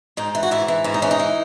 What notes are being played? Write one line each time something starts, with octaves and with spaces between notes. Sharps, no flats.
G#2 D#4
E3
F#4
G#2 E4
E3
G#2 E4
D#4
E3 C#4
D#4
E3